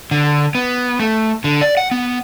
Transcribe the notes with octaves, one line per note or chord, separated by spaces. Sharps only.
D3
B3
A3
D3
D5
F#5
B3